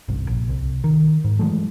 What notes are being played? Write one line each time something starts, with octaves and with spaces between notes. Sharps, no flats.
G1 C2
A#1
C2
D#3
G#2
E3 F#3 G#3 A3